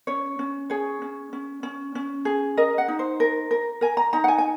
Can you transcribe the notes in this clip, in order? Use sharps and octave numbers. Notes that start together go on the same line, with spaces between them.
C#4 C#5
C#4
G#4 C#5
C#4
C#4
C#4
C#4
G#4
A#4 D#5
F#5
D#4
C5
A#4
A#4
A#4 G#5
A#5
D#4 A#5
F#5
G#5
G#5